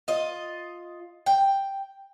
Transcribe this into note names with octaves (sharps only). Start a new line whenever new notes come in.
F4 D#5
G5